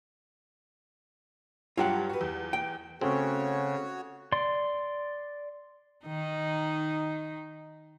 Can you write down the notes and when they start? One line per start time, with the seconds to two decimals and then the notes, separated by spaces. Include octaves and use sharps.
1.77 G2 F#3 F4 G4 F#5
2.09 F#4 B4
2.21 E2
2.53 G5
3.01 C#3 A3 C4 C#4 F#4 C#5
4.32 D5 C6
6.06 D#3 D#4